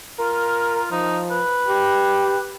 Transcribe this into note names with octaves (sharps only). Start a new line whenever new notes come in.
F4 A#4
F3 D#4
B4
G4